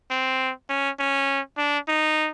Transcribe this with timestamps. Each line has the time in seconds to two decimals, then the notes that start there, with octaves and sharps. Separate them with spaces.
0.10 C4
0.69 C#4
0.99 C#4
1.58 D4
1.88 D#4